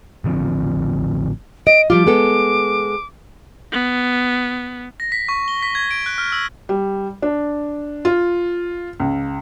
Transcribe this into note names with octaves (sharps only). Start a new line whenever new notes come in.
A1 D3 F3 C4
D#5 D7
F3 G3 F4 D6
G#3 B3 A4
B3
A#6
B6
C#6
G7
B6
G#6
D7
F#6
F6
E6
G3
D4
F4
C#2